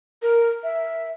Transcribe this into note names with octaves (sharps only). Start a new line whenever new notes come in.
A#4
E5